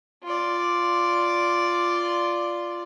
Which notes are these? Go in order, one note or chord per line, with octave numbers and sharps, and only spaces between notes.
F4 D5